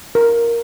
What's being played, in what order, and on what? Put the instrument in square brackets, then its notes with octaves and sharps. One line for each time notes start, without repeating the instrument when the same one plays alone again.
[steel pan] A#4